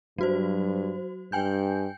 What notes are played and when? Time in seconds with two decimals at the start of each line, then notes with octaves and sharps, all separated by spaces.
0.18 G2 F#3 F#4 C5
1.32 G2 G5 G#5 G6